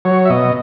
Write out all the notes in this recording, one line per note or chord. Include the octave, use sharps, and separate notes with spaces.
F#3 C#5
E5
B2 D#5